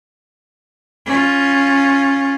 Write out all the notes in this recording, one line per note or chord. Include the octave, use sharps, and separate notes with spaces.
C#4 F4